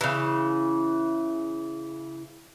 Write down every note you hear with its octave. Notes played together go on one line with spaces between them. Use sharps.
C#3 E3